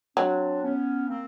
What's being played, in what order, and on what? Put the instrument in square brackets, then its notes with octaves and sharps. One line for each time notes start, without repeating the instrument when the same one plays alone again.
[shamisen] F#3 [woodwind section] C4 D4
[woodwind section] B3 C#4
A#3 C4